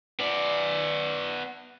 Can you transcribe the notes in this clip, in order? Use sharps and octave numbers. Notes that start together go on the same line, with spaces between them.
B3 D5